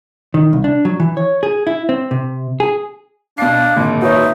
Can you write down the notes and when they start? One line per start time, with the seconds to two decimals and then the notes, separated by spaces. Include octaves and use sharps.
0.34 D#3
0.53 C2
0.64 D4
0.85 F#3
1.00 E3
1.17 C#5
1.43 G#4
1.67 E4
1.89 C4
2.11 C3
2.60 G#4
3.38 B2 D4 F5 C7
3.76 G#1 A#2 D3
4.02 D#4 F#4 B4 C#5 E5